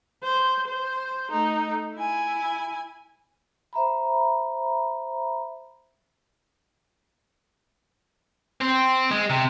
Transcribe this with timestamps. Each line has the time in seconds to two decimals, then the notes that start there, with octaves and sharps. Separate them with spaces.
0.23 C5
0.68 C5
1.31 A3 D#4
1.96 E4 G#5
3.73 C5 E5 A#5 B5
8.61 C4
9.11 G#3
9.30 C3